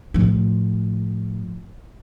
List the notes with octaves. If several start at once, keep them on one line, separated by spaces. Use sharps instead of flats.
A2 F3